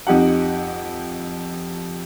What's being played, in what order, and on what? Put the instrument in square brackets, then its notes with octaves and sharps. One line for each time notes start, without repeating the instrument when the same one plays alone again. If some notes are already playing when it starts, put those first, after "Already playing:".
[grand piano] F2 D#4 G4 F#5